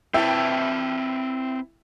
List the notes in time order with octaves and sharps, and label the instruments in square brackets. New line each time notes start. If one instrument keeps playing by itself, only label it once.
[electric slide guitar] C4 B4 A5 [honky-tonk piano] E4 E5 G5